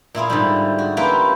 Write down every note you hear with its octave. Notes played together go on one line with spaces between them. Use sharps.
A#2 E4 F4 G#4
G#2 D3 G3
F#4
A#3 C#4 E4 F4 G4 B4